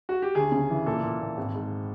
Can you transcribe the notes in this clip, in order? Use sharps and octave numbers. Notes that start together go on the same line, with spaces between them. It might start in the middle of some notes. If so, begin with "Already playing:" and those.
F#4
G4
D2 G#4
C#3
E3
A#2 A4
A#2
A#2
G#1
G#2